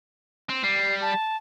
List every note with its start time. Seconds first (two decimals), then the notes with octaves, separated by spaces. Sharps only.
0.49 C4
0.63 G3 C7
1.02 A5